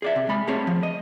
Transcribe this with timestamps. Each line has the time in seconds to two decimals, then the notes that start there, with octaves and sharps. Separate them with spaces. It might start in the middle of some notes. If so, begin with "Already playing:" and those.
0.02 G#4 D5 E5
0.16 C3
0.29 G#3 B5
0.47 A3 C4 G4 G#4 C#5
0.67 F3
0.83 D#5